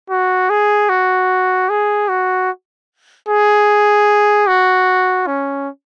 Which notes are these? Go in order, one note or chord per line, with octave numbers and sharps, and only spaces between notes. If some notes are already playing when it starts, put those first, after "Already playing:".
F#4
G#4
F#4
G#4
F#4
G#4
F#4
C#4